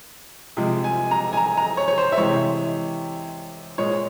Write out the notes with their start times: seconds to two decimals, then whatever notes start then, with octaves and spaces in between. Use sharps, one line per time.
0.57 C3 F3 G#3
0.84 G#5
1.11 A#5
1.33 G#5
1.37 A#5
1.57 A#5
1.77 C#5
1.88 C#5
1.98 C5
2.12 E5
2.17 C3 E3 G#3 C#5
3.78 A#2 G#3 C#5